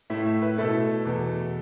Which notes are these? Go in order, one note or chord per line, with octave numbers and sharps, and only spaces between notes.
A2 A3 E4 E5
E5
B4
B2 A3 E4 A4
E2 B2 B3